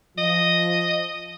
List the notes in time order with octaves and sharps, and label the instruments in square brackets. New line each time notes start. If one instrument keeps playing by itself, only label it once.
[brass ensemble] F3 [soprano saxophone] D#5